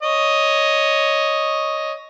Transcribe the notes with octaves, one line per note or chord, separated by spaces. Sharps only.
C#5 D#5